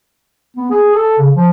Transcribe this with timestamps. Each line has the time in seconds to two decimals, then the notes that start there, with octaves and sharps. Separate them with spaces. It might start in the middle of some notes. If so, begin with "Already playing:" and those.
0.57 B3
0.70 G#4
0.95 A4
1.18 C#3
1.34 F3